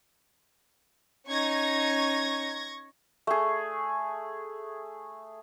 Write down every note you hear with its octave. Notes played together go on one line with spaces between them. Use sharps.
C#4 D#4 C#6 G#6 A#6
A3 G#4